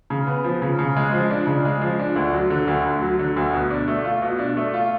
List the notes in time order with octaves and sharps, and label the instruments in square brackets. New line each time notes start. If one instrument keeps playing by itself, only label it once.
[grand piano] C#3
B3
F3
C#3
C#3
G#3
F3
D4
C#3
G#3
F3
D4
D2
F#3
D3
D2
D2
F#3
D3
D2
B2
D4
A3
F4
B2
D4
A3
F4